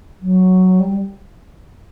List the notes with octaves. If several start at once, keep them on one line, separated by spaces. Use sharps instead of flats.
F#3
G3